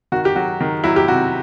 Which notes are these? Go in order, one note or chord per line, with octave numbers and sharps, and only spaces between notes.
D#3 F#4
G4
F#3 F#4
D#3
F#3 E4
G4
C3 F#4